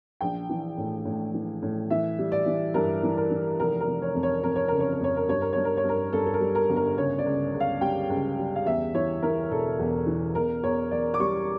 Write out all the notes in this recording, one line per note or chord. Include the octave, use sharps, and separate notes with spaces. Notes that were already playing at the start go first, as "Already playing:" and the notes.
A#1 G5
E3
A2
A2
E3
A2
E3 E5
G3
D5
E3
G2 A#4
E3
A#4
E3
F1 A#4
A#4
F1
C#5
F2
C#5
F2 A#4
C#5
C#3 A#4
C#5
A#4
F2 C#5
A#4
G2 C#5
A#4
G2 C#5
A#4
C#5
G2 A#4
G2 A4
A4
A#4
G3
A#4
G1
A#4
C#3 C#5
D5
C#2
C#2
F5
G3 G5
C#2
G3
F5
E2 E5
E3 C#5
E3 A#4
E1 A4
E2
E3
E2 A#4
E2 C#5
E2 D5
D6
G3 C#6